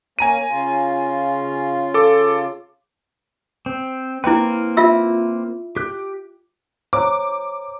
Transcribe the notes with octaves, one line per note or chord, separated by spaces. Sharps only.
A#3 C#4 G#5 A#5 D#7
C#3 F4
A4 D6
C4
A#3 C4 E4 B4 G5
F4 E5 E6
G4 F#6
C5 C#5 A#5 D6